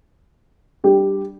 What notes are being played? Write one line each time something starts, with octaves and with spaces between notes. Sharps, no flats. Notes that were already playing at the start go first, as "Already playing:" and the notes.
G3 D4 G4